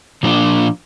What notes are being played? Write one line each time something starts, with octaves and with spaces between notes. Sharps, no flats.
A#2 F3 A#3 D4 F4